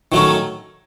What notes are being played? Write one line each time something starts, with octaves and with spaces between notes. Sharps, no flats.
D#3 F#3 A3 C#4